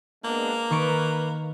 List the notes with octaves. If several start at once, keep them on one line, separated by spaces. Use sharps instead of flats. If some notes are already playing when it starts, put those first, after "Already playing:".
G#3 A#3 B3 D4
D#3 B4 C#6 D7